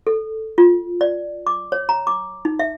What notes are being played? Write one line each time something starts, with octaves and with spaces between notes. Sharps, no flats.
A4
F4
D5
D6
C#5
A#5
D6
D#4
E5